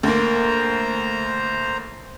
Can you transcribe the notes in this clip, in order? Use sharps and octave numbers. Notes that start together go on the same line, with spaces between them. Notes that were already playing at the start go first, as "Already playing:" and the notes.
D2 A#3 C5 A#5